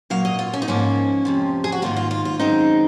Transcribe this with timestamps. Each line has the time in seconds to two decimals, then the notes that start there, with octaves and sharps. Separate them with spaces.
0.10 A#2 F#3 A#3 F5
0.25 D#5
0.39 F4
0.53 C#4
0.62 D#4
0.68 G#2 F3 A#3 C#4
1.25 F2 C3 F3
1.64 G#4
1.72 F#4
1.82 G#2 D#3 A#3 F4
1.96 F4
2.11 F4
2.25 F4
2.39 F#2 D#3 G#3 C4 D#4